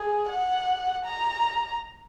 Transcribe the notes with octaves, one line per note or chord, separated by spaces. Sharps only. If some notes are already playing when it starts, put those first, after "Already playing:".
Already playing: G#4
F#5
A#5